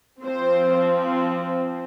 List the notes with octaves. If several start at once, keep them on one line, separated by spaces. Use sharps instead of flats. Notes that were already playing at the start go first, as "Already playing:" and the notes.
F3 C4 C5